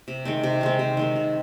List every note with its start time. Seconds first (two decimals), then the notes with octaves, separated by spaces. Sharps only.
0.08 C3
0.25 D#3 G#3 C4
0.43 C3
0.61 D#3 G#3 C4
0.79 C3
0.97 D#3 G#3 C4
1.16 C3